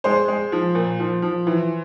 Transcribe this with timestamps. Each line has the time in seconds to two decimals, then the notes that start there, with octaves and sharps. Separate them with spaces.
0.04 G#3 C5
0.28 G#3
0.52 F3
0.75 A#2
1.00 F3
1.22 F3
1.47 E3